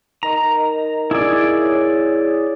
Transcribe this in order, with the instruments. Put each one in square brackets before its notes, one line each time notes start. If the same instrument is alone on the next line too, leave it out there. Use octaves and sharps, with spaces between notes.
[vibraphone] D#4 A#4 D#5 [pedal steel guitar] A#5
[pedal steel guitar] E4 G#4 D5
[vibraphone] C#5